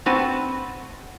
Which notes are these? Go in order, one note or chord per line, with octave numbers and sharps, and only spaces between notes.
C4 F#4 B4 A5